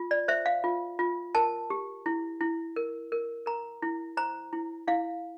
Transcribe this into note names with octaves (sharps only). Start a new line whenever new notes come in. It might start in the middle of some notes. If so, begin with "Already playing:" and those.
Already playing: F4
D5
C5 E5
F5
F4
F4
A#4 A5
G4
E4
E4
A#4
A#4
A#4 A#5
E4
C5 A#5
E4
E4 F5